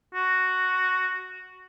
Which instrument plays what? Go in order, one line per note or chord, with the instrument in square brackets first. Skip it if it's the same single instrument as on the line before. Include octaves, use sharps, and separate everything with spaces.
[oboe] F#4